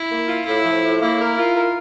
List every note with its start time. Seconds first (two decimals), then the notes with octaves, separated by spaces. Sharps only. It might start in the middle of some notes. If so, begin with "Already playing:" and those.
Already playing: E4
0.10 A#3
0.28 F4
0.46 A2 E4
0.64 F3
0.82 A2
1.00 A#3 E4
1.19 A#4
1.37 F4
1.55 A#4